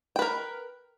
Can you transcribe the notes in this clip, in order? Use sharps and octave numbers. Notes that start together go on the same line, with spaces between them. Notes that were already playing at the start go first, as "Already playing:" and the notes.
A#4 B4 G5